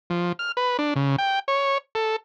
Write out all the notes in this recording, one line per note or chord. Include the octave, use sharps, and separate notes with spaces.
F3
F6
B4
D4
C#3
G5
C#5
A4